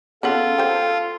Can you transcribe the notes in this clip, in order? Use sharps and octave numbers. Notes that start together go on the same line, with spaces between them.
C#3 B3 F4 A4 F#5
C5 G5